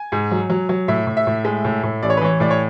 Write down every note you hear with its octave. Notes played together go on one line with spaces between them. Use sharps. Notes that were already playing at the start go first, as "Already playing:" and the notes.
Already playing: G#5
G#2
F#3
F#3
F#3
A2 E5
A2
E5
A2
G#3
A2
A2
A1 D5
C#5
B4
E3 C#5
A2 D5
C#5